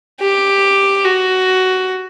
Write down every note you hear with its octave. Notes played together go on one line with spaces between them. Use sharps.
G4
F#4